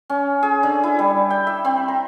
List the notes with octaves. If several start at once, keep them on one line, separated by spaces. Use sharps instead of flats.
C#4
G#4
D3
E4
G3
G5
E5
C4
A#5